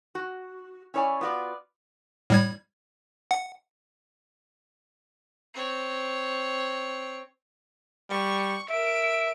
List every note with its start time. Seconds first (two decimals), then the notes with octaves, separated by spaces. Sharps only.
0.15 F#4
0.94 C#4 E4 C#5 D5 G#5
1.21 B3 F4 F#4 C#5 D5
2.30 A2 G3 G#6
3.31 F#5
5.54 C4 C#5
8.10 G3 C#6
8.70 A#4 E5 D7